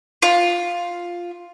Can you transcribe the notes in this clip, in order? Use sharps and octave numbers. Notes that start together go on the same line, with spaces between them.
F4